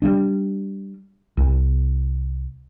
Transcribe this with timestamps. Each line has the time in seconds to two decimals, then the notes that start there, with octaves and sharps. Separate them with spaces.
0.02 G3 G#3 D4
1.37 C2